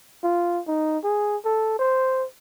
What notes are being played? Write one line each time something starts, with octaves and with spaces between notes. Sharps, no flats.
F4
D#4
G#4
A4
C5